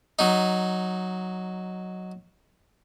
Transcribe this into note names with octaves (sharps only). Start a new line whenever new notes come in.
F#3 D#4